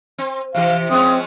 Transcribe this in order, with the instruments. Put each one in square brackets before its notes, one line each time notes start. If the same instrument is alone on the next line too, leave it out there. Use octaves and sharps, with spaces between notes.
[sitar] C4
[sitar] C3 E3 G4 [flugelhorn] F5
[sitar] F3 G#3 C#4 [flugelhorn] C4 [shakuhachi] D#6